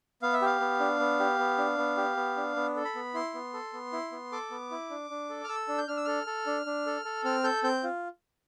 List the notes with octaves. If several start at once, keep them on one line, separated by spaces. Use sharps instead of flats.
B3 F5
E5
G4 F5
B3
D4
B3
G4
B3
D4
B3
G4
B3
D4
B3
A4
B5
B3
E4 C6
B3
A4
B3
E4
B3
A4 D6
B3
E4
D4
D4
A4
F6
A4 E6
D4
G6
D4 F6
E6
A4 F6
A4
D4
D4
A4
A4
C4 F6
A4 G6
C4 G6
F4